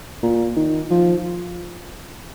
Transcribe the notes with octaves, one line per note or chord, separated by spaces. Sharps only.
A#2
D#3
F3